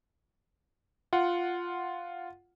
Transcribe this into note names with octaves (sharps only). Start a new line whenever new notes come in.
F4 F#5